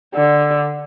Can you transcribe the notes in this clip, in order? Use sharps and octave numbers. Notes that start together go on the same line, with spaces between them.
D3